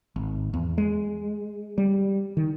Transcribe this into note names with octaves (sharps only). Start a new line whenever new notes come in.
G#1
E2
G#3
G3
D#3